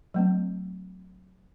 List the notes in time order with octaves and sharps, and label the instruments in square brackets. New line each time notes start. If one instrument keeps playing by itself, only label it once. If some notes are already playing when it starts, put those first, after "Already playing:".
[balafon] F#3 A3 C4